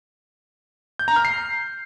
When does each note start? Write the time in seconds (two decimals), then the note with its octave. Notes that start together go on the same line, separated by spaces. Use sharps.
0.99 G6
1.08 A#5
1.16 F6
1.25 C7